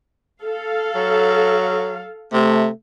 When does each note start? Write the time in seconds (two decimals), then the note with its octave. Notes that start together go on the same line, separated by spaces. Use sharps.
0.42 A4 F5
0.95 F#3
2.33 C3 A3